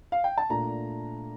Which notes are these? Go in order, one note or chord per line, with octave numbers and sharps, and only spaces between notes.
F5
G5
A5
A#2 A3 D4 A#5